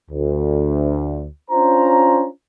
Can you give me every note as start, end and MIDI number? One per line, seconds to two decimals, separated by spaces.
0.11 1.27 38
1.50 2.26 61
1.50 2.26 62
1.50 2.26 65
1.50 2.26 72
1.50 2.26 82